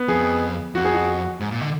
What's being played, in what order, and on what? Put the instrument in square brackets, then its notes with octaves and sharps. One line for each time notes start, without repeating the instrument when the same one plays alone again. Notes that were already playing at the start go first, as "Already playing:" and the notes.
Already playing: [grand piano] B3
[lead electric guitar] F2 [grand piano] G#4
[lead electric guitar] F2 [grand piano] F#4
[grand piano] G#4
F#4
[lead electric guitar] G#2
A#2
D3